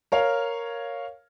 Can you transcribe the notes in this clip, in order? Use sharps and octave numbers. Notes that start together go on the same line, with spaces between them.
A#4 C#5 F5